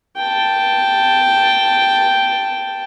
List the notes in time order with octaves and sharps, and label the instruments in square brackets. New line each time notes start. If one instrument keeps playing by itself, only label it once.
[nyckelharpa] G5 A5